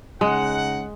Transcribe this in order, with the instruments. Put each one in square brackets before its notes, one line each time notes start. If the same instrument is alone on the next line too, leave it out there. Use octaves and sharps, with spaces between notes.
[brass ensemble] C#3 D#4 F#5 [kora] G#3